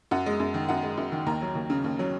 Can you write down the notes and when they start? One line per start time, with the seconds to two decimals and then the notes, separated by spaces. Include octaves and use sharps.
0.11 F#2 F#5
0.26 G#3
0.40 F#2
0.54 D#3
0.69 F#2 F#5
0.83 G#3
0.97 F#2
1.12 D#3
1.27 D#2 A#5
1.42 F#3
1.55 D#2
1.70 C#3
1.84 D#2
1.99 F#3